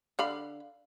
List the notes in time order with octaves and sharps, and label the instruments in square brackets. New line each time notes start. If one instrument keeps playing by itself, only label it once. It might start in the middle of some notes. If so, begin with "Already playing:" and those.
[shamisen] D3 F5 B5